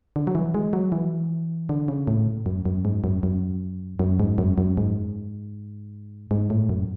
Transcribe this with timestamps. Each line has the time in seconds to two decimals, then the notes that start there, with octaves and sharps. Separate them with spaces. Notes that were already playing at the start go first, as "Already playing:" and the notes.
0.16 D3
0.27 F#3
0.35 E3
0.54 G#3
0.73 F#3
0.92 E3
1.69 D3
1.88 C#3
2.07 A2
2.46 F#2
2.65 F#2
2.85 G#2
3.04 F#2
3.23 F#2
3.99 F#2
4.20 G#2
4.38 F#2
4.58 F#2
4.77 G#2
6.31 G#2
6.50 A2
6.69 F#2